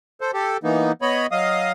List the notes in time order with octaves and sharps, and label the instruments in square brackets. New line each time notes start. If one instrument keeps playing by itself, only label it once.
[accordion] A4 C5
G4 A4
E3 A#3 B3 D#4
B3 C#5 D#5 B5
F#3 D#5 F5 D#6